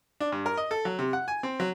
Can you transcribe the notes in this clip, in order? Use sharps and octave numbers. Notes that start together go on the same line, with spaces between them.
D4
G2
A#4
D#5
A4
F#3
C3
F#5
G#5
C4
F#3